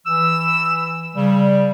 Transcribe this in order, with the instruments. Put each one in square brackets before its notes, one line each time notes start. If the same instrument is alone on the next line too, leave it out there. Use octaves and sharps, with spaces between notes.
[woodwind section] E3 E6
C#3 G3